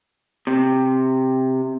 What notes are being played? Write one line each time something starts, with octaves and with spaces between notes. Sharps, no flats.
C3